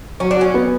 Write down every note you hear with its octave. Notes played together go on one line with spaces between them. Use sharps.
F#3 C#4
D4
C#4 F#4
B3